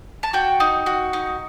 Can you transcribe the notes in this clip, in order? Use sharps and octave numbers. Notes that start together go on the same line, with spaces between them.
A5
F#4 G5
D#4
F#4
D#4